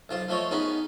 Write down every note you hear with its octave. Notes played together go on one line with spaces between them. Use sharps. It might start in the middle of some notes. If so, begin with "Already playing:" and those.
B1 F4 C5
F3 A3 C5 C#5 D#5
B3 C#4 D#4 G#4 D#5